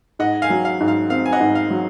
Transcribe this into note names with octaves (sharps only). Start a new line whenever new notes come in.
G#2 D#5 F#5
F5 G#5
F#3
F5
G#2
F5
C4 F5
G#5
D#5 F#5
G#2
F5
F#3